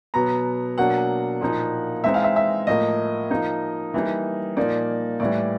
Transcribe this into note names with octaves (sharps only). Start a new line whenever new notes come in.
B2 F#3 B3 A#5
B2 F#3 A#3 D4 F#5
A#2 F3 A#3 D#4
E3 G#3 C4 D#4 E5
F5
E5
E5
A2 F3 A#3 D#5
F3 A#3 D#4
E3 G3 A#3 D#4
A#2 F3 A#3 D#4 D5
A2 E3 G3 D5